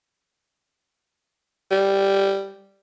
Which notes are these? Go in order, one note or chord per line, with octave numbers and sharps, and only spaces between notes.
G3